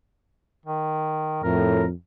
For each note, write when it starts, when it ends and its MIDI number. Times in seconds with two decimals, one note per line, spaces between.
0.66 1.42 51
1.43 1.92 41
1.43 1.83 45
1.43 1.85 70